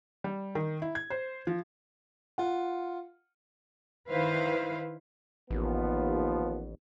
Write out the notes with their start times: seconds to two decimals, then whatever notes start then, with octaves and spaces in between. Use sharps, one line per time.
0.24 G3
0.55 D#3
0.82 E4
0.95 G#6
1.10 C5
1.47 F3
2.38 F4 F#5
4.08 D#3 E4 B4 C5 F5
5.51 A1 D#2 F3 B3